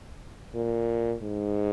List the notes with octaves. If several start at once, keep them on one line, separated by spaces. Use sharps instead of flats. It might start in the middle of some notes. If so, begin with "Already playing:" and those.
A#2
G#2